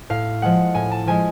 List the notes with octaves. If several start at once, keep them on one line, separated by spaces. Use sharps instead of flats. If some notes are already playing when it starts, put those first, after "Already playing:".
A2 F5
F3 G#3 F#5
A2 G#5
A5
F3 G#3 G#5